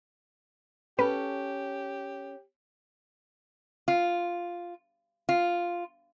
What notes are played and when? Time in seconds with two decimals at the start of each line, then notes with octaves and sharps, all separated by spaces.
0.99 C#4 G4 A4 B4
3.88 F4
5.29 F4